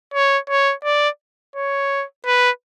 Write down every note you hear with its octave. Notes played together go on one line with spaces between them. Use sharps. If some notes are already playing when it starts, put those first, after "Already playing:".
C#5
C#5
D5
C#5
B4